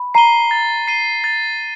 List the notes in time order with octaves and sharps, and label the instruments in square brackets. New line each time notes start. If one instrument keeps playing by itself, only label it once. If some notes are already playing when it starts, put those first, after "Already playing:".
Already playing: [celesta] B5
[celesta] A#5 [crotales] C7 D#7 G7
[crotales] A6
C7 D#7 G7
A6